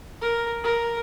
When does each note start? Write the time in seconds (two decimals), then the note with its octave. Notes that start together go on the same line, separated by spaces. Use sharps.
0.21 A#4
0.64 A#4